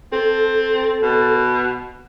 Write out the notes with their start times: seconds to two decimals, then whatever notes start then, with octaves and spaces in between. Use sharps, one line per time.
0.12 C4 A4
1.02 B2